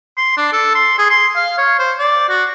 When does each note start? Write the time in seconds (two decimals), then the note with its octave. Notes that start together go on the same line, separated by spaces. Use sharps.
0.17 C6
0.37 D4
0.53 A4
0.75 C6
0.98 G#4
1.10 C6
1.36 F5
1.58 C#5
1.79 C5
1.99 D5
2.29 F#4